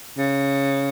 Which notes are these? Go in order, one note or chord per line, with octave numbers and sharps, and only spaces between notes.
C#3